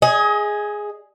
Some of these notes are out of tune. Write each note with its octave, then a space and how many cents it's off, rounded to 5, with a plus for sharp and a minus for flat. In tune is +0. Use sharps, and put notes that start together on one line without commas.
G#4 +0 D#5 +30